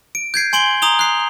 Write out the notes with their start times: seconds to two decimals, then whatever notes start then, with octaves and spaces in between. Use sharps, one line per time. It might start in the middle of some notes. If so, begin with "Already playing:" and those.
0.15 D7
0.34 G6 G#6 C7 D7
0.53 G#5 C6 D7 F#7 G7
0.82 A#5 D#6 F7 G7
0.99 F#6 C7